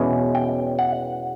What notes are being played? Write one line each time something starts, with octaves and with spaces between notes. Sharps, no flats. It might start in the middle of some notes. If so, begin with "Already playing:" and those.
Already playing: E2 B2 G#3 C#4
G5
F#5